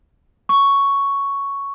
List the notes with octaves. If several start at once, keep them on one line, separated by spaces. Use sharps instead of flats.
C#6